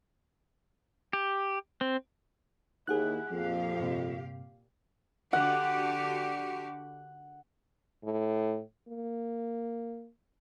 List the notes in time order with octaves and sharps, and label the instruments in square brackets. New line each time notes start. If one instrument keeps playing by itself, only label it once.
[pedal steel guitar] G4
C4
[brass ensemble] D#2 [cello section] E4 [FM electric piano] G#4 F#5 F#6
[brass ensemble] F2 [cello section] A#2 G4 F5
[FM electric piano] G2 C3
[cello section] D3 F#4 G4 [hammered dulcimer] F#5
[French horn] A2
A#3